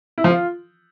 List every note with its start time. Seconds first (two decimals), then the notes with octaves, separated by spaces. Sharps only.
0.18 E4
0.24 F3
0.31 F4